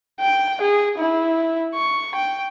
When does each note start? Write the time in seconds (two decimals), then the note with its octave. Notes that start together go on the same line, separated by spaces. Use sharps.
0.20 G5
0.61 G#4
0.98 E4
1.75 C#6
2.15 G5